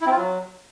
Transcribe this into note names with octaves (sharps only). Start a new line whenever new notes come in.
E4
C4
F4
F#3